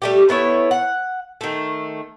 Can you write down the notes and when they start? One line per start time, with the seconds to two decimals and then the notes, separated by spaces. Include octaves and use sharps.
0.02 G3 A3 G4
0.29 A3 B3 E4 C#5
0.71 F#5
1.41 D#3 A3